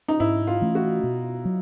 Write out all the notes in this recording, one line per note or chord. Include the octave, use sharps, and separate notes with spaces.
D#4
G#2 E4
F4
E3 A3 C#4
F#4
B2
F#3